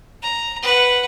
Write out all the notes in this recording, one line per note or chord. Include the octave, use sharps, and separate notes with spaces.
A#5
B4 F#5